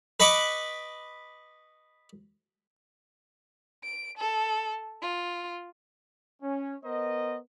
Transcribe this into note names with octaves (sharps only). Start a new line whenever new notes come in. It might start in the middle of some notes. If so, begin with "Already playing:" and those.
B4 D#5 B5 C#6 D6
D7
A4
F4
C#4
B3 A#4 C5 D#5